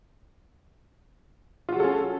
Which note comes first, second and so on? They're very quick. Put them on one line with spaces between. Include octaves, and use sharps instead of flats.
F4 F#4 F#3 A4 C#4